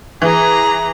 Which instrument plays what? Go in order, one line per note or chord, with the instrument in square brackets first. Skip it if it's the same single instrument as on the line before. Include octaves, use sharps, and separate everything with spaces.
[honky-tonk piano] E3 [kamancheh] G#4 A#5